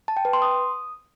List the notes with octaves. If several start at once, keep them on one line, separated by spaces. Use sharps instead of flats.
A5
G5
B4
C6
D#6